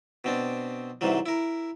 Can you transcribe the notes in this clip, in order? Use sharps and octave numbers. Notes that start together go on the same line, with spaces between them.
B2 C4 D4
G#2 C3 E3 F#3 G3
E4 A#4